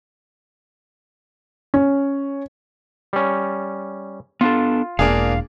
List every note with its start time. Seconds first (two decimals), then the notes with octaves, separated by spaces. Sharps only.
1.74 C#4
3.13 G3 C#4
4.41 B3 D4 F4 A4
4.99 E1 A#3 D4 G#4 F5